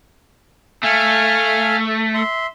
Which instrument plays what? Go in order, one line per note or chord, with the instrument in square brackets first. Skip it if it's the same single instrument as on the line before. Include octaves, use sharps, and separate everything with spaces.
[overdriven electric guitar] A3 [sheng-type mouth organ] F5 G#5 F6
[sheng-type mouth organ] E5 C6